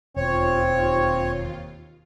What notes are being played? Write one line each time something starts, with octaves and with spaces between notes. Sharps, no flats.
E1 D#2 C4 F4 C#5